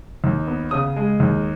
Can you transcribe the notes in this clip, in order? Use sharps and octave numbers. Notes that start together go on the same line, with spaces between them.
D#2
B3
C#3 D#6
G#3
D#2